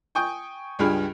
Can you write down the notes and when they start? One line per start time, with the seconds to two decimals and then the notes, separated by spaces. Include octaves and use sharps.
0.15 G5 G#5 C#6 D#6 G6
0.79 C#2 G2 G3 G#4 B5 F6